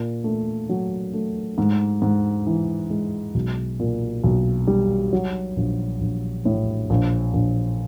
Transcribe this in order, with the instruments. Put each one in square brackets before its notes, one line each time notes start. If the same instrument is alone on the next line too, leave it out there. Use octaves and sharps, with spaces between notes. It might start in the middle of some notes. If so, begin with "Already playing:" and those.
Already playing: [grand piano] A#2
A3
F#3
A3
G#2
G#2
E3
G#3
B1
A#2
B1
G3
F#3
A#1
A#1
A2
A#1
A#1